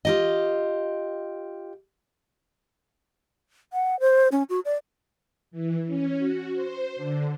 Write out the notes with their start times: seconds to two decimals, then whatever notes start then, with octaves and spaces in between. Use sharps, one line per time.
0.05 F4 G4 D#5
3.73 F#5
4.00 C5
4.32 C#4
4.49 F#4
4.65 D5
5.51 E3
5.87 C#4
6.18 F#4
6.53 C5
6.96 D3